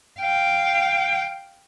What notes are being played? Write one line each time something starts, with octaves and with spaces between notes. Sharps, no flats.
F5 G5